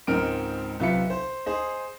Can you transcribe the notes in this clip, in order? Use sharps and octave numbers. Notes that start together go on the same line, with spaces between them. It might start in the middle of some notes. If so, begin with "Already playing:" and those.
C#2 G#2 C4 A#4 F6 D7
B1 C3 F4 B4 E5 C#7
C5
G#4 C5 D#5